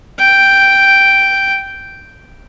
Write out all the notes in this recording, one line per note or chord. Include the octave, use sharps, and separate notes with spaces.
G5